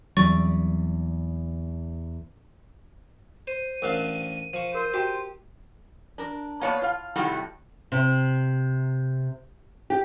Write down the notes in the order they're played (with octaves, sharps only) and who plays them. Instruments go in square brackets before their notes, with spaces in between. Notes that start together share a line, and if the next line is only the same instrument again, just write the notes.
[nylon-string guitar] E2 D5 [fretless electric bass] F#3 G3 C4 [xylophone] C#6 A6
[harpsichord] C5 [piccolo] D#7
[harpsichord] A1 D4 F5 [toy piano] A#4 C5 F#5
[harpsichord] F3 C#6
[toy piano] A#4 [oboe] C5
[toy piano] F#4 G5 A#5 [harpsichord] G4
[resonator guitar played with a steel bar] D4 A#4
A#3 B3 C#5 D5 A5
F4 F5
A2 C3 D#3 G3 A3 F#4
[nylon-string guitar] C3
G4